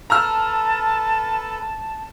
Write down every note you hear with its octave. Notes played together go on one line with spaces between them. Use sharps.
A4 B4 A5 A#5 E6 F6